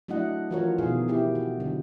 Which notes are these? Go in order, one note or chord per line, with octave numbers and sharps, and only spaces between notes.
F#3 A3 D4 E4 D#5 F#5
E3 F3 F4 F#4 A#4 C#5
B2 D#3 G#4 F5
C4 E4 G4
F#4
D3 F#3